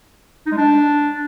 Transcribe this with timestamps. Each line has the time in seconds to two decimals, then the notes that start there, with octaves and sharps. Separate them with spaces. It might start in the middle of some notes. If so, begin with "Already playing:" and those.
0.46 D#4
0.52 G#3
0.57 D4